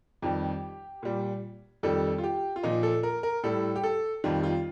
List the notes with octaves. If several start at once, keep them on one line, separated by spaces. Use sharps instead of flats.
F2 D#3 G3 G4
A#2 G3
F2 D#3 G3 A4
F4
G4
F4
A#2 F3 D#4
A4
A#4
A#4
A2 G3 A4
G4
A4
F2 D#3 G3 F4
F4